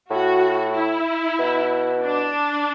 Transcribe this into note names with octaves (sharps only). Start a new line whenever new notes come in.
A2 F#4
E4
B2
D4